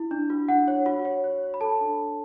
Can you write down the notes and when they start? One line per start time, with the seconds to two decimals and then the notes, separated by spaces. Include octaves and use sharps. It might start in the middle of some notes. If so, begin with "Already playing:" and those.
Already playing: E4
0.11 D4
0.30 F#4
0.48 D4 F#5
0.68 C#5
0.86 F#4
1.05 C#5
1.24 C#5
1.43 C#5
1.54 B5
1.61 A4 A5
1.81 D4
1.99 A4